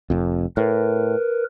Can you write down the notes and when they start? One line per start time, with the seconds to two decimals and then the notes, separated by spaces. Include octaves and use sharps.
0.10 F1 F2
0.57 A2 A#4 B4